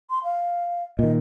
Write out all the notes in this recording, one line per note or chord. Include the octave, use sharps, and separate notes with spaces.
C6
F5
A#2 D#3 D#5